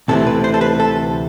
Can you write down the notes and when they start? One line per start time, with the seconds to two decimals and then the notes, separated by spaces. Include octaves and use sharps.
0.08 D2 C3 E3 A3 C4 A4
0.27 B4
0.44 C5
0.54 A4
0.61 B4
0.80 A4